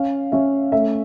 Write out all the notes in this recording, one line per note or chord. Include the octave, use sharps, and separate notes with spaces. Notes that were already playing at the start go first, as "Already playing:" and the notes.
Already playing: C#4 F5
C#4 E5
A3 E5